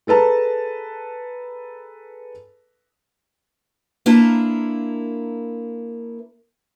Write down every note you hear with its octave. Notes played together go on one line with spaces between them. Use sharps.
G#4 A4 B4 A5 A#5
A#3 D4 E4 F4 A#4